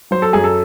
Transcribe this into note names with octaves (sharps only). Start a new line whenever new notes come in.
F#3 C5
A4
F#2 G#4
A4